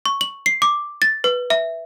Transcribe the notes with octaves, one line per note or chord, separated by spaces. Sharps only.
C#6
F#7
C7
D6
A6
B4
E5